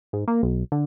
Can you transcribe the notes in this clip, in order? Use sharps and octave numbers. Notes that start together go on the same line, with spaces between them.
G#2
A#3
B1
D3